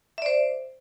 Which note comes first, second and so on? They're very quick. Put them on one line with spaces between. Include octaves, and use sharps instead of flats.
E5 D5 C5